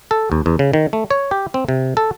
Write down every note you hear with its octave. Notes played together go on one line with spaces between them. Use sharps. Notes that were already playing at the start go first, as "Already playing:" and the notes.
A4
D#2
E2
C#3
D#3
A3
C#5
G4
C4
C3
A4